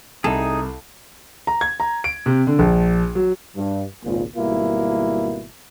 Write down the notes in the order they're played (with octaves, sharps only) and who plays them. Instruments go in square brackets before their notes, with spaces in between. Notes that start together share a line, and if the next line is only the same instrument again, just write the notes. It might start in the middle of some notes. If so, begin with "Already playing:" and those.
[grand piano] C2 [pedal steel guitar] D#4 G#4 [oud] A4
[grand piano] A#5
G#6
A#5
D7
C3
D3
A#1
F#3
[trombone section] G2
G#1 C#2 A#2
G#1 B2 G3 A#3 E4